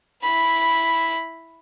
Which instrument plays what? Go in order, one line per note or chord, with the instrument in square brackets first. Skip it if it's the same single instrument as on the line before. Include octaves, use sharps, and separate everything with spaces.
[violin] E4 B5